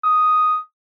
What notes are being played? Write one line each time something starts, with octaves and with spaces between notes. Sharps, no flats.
D#6